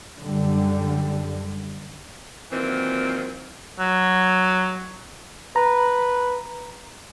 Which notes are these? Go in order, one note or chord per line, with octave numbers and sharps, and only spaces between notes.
F#2 D3 G3
A#2 D#3 E3 F#3 C4
F#3
B4 A#5